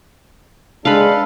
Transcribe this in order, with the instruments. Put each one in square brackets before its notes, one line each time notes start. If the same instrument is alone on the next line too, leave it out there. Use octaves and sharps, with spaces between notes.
[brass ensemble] G#3 D4 [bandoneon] A4 [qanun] B4 F5